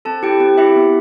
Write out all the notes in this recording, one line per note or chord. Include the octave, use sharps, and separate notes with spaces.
C4 A4 A5
E4 G4 G5
C4 G4 G5
E4 G4 E5
B3